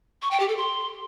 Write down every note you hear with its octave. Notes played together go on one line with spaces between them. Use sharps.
C#6
G5
G4
A4
C6